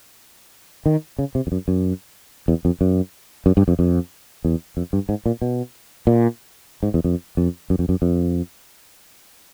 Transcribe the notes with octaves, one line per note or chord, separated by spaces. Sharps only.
D#3
C#3
C3
F2
F#2
F#2
E2
F2
F#2
F#2
G2
F2
F2
E2
F2
G2
G#2
A#2
B2
A#2
G#2
E2
F2
F2
F#2
F2
F#2
F2